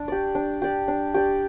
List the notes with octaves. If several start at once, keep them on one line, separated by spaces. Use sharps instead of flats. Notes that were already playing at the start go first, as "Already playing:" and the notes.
Already playing: D4
G4 D5
D4
G4 D5
D4
G4 D5